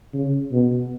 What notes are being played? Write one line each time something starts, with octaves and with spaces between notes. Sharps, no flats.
C#3
B2